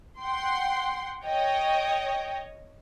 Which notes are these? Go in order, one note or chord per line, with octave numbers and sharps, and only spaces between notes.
F#5 G5 C6
C#5 D#5 G5